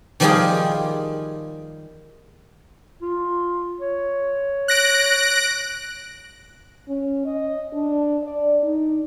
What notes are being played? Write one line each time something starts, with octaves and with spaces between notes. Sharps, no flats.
D#3 F3 G3 F4 G4 G#4
F4
C#5
F#6 A#6 D7
C#4
D#5
D4
D5
D#4